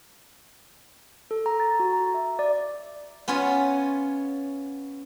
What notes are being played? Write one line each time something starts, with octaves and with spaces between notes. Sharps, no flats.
A4
A#5
A6
F#4
A#5
E5
D5
B3 C#4 F4 C#5